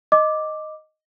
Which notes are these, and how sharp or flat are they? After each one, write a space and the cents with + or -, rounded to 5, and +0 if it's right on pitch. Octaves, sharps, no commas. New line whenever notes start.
D#5 +0 D6 +0